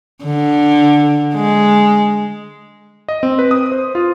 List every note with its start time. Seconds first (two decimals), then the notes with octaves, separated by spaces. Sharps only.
0.24 D3
1.35 G#3
3.09 D#5
3.23 C4
3.39 B4
3.51 D#6
3.72 C5
3.95 F4